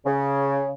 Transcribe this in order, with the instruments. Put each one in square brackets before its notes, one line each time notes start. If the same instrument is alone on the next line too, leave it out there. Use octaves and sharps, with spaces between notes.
[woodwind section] C#3